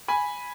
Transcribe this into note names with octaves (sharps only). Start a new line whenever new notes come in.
G#5 B5